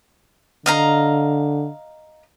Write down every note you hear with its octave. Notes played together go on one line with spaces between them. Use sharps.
D3 D#5 F5 A#5